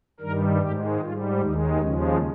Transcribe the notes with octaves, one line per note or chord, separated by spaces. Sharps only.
G2 D#3 G3 A#4
G#2 D#3 G#3 G4
G#2 G3 F4
D#2 D#3 G#3 D#4
D#2 C#3 F3 G#3 C#4